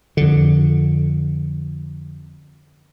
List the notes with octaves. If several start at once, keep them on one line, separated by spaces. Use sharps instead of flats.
F2 D3